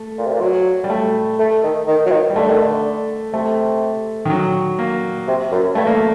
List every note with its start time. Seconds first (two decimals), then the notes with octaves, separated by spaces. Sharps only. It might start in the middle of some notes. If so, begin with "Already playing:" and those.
Already playing: A3
0.18 A#2
0.26 C3
0.33 A#2
0.41 F#3
0.84 G3
0.90 A3
1.39 A3
1.63 D#3
1.87 D#3
2.06 F#3
2.11 D#3
2.30 G3
2.36 D3 A3
2.48 D#3
2.60 D3
3.33 C3 A3
4.25 D#3
4.30 F#3
4.79 A#3
5.27 C3
5.51 F#2
5.75 G2 A3
5.87 A#3
5.97 A3